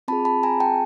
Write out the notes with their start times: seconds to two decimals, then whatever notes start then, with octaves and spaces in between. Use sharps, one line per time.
0.08 C4 F4 G#4 A5 B5
0.25 A5 B5
0.43 G#5 A#5
0.60 G5 A5